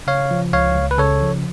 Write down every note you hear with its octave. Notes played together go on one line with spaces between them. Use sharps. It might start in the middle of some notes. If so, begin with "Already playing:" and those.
C#3 C#5 F5
F3
C#2 C#5 F5
C#2
B4
C#3 A4 C#5
F3